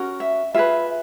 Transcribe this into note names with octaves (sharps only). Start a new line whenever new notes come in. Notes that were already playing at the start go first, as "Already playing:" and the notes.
Already playing: C#4 F#4 A#4
E5
F4 G#4 B4 E5